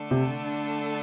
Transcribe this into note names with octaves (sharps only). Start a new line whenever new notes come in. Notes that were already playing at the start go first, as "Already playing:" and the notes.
Already playing: D3 A3 D4 A4
C3